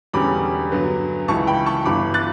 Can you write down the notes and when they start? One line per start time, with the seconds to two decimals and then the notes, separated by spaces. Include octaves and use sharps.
0.13 E1 E2 D3 G3 C#4 B5 D6
0.71 G2 D3 F#3 B3
1.28 C#2 C#3 E3 A5 C#6
1.47 G5 B5
1.66 A5 C#6
1.85 G1 G2 E3 B5 D6
2.14 F#6 A6